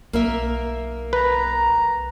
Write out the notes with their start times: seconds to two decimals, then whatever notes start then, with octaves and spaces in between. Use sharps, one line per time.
0.13 B1 A#3 A#4 E5
1.13 B4 A#5